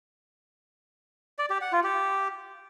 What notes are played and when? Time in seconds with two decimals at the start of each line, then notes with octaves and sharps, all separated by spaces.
1.39 D5
1.50 G4
1.61 F#5
1.72 F4
1.84 G4